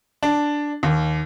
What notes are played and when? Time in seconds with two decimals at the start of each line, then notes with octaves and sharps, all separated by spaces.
0.23 D4
0.83 D#2